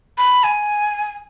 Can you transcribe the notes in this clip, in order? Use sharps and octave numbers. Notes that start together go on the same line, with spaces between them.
B5
G#5